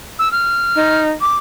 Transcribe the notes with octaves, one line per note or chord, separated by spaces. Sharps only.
E6
F6
D#4
D6